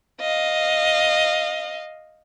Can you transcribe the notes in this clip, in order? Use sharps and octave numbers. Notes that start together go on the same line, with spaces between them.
D#5 F5